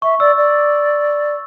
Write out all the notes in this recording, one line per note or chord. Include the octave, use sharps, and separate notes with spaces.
E5 C#6
D5 E6
D5